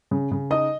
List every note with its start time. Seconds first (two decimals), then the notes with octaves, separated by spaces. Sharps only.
0.11 C#3
0.31 C#3
0.51 D#4 D#5 D#6